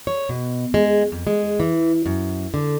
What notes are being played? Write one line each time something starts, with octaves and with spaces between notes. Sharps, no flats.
C#5
B2
G#3
F2
G#3
E3
F#2
D3